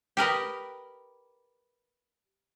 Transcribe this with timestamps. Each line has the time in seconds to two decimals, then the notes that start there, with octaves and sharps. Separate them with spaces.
0.17 G4 A#4 B4 D#5